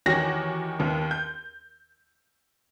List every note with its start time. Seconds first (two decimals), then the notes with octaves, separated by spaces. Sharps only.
0.06 E2 D#3 F#4 G4 C#5 A#6
0.79 D#2 D#3 B3
1.11 G6